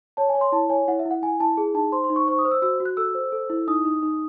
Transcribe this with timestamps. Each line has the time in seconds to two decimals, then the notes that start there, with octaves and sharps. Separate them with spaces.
0.17 C#5 A5
0.29 G#5
0.35 C#5
0.41 C6
0.52 E4 A5
0.69 C#5 G#5
0.88 E4 F#5
0.99 E5
1.06 E4
1.11 F#5
1.22 E4 G#5
1.40 E4 A5
1.57 G#4
1.74 D#4 A5
1.92 C5 C6
2.04 C6
2.10 D#4
2.16 C#6
2.27 C5 C#6
2.39 D#6
2.45 C5
2.51 E6
2.62 F#4 E6
2.80 F#4
2.85 F#6
2.97 A4 E6
3.15 C5
3.32 A4
3.50 E4
3.68 D#4 D#6
3.85 D#4
4.03 D#4